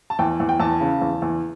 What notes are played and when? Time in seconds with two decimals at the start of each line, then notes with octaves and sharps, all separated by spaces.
0.10 A5
0.19 E2 G5
0.40 E2
0.49 G5
0.60 E2 A5
0.80 C#3
1.02 E2
1.22 E2